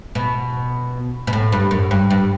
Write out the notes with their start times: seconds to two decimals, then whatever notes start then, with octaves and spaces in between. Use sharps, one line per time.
0.15 B2
1.27 B2
1.33 A2
1.52 G2
1.71 F#2
1.91 G2
2.10 G2